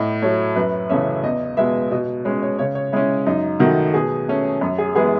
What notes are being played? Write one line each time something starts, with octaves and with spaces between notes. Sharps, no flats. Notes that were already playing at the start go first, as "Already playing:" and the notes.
Already playing: A2 D#5
F#3 A3 C#5
F#2 B4
C#3 E3 A3 C#4 E5
E2 D#5
B2 G#3 B3 E5
B2 D#5
G#3 C#4 C#5
C#5
C#3 C#5
C#5
G#3 C#4 E4
F#2 D#4
D#3 A3 F#4
B2 G#4
A3 C#4
F#2
G#4
E3 G#3 B3 G#4